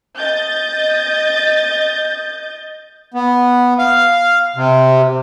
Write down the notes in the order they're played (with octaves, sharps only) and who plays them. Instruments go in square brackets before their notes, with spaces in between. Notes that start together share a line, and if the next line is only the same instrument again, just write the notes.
[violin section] D#5 G6 A6
[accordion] B3
F5
C3